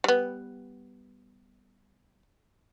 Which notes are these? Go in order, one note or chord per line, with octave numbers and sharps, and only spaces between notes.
G3 B3